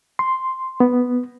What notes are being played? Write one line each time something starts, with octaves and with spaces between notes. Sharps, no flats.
C6
B3